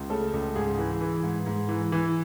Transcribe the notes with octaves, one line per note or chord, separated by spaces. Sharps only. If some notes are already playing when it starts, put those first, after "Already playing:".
Already playing: C#2
C#3 A3 A4
C#2
G#2 G#4
E3
E3
G#2
G#2
E3
E3